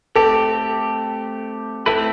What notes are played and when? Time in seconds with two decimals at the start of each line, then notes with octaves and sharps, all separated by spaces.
0.15 A3 C4 G4 A4
1.86 A3 C4 E4 A4 B4